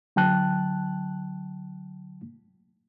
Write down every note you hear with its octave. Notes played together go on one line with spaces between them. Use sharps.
D3 F#3 G5 A5 F#6